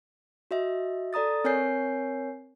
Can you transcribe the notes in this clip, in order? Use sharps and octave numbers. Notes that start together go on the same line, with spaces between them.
F#4 D#5 E5
A4 D5 A#5 D#6 A6
C4 A#4 C#5 G#5 G6 C7